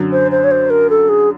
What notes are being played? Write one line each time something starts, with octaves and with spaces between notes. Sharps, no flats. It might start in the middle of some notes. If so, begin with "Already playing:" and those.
Already playing: F#2 D3 F#3
C5
C5
C#5
C5
A#4
A4
G#4